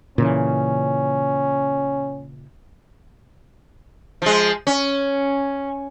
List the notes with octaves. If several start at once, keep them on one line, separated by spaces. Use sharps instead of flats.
A#2 C#3 E3 C#4
F3 G#3
C#4